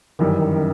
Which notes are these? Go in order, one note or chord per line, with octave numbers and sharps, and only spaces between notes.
G1 F#2 D#3 E3 G3